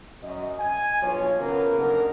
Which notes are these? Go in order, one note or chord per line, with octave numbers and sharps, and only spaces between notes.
F#2 D#5
G#5
B1 G2 F3 F4 C#5
C#3 F#3 A#3 B3 A#4
F#1 D3 D#4 A4 A#4